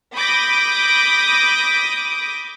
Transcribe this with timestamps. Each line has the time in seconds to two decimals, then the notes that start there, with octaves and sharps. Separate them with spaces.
0.15 B5 D6 D#6 G6 A#6